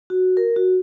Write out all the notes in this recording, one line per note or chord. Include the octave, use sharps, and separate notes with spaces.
F#4
A#4
F#4